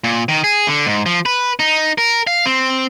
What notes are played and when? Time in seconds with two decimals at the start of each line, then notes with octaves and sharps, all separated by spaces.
0.04 A#2
0.29 D#3
0.44 G#4
0.67 D3
0.86 G#2
1.06 F3
1.26 B4
1.60 D#4
1.98 A#4
2.27 F5
2.46 C4